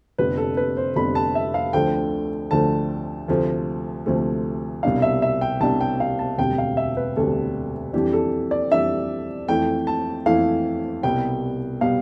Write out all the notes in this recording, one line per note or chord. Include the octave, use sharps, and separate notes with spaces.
F1 F2 D3 G3 B3 B4
A4
B4
C5
F1 F2 D3 G3 B3 B5
A5
E5
F5
D2 D3 F3 A3 G5
D2 D3 F3 A3 A5
D2 C3 F3 A3
D2 C3 F3 A3
C2 B2 G3 D4 F5
E5
E5
G5
C2 B2 G3 D4 A5
G5
F5
A5
E1 D2 C3 G3 G5
F5
E5
B4
E1 D2 C3 G3 A4
F2 E3 G3 D4 G4
A4
D5
F2 E3 G3 D4 E5
F2 E3 A3 E4 G5
A5
F2 E3 A3 E4 F5
C2 B2 G3 B3 G5
B2 G3 B3 F5